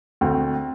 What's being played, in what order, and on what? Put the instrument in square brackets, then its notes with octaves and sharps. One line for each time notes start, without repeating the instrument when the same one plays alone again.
[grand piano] D2 C4